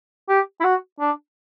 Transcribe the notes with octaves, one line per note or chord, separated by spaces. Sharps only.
G4
E4
F#4
D4